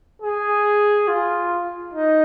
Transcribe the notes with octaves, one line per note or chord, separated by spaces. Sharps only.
G#4
F4
D#4